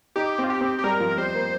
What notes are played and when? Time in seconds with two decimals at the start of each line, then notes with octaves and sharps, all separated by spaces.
0.16 D#4 G4
0.38 C4
0.44 F4
0.50 G4
0.61 C4
0.78 G4
0.84 G3 A#4
1.00 F3
1.18 G3 C5
1.35 A#3